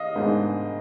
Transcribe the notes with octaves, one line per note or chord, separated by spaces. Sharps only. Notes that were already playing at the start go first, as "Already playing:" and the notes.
Already playing: D#3 D#5 F5
G#2 D#3 G#3 B3 D4